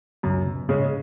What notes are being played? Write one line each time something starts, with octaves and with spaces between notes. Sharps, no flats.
C#2 F#2 C#3
B2
G#2 C#3 G#3 C#4